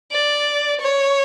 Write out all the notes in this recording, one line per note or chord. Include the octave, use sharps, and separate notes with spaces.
D5
C#5